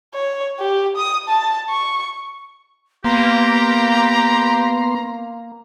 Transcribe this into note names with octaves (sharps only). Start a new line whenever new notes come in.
C#5
G4
D#6
A5
C#6
A#3 B3 G4 A#5 C6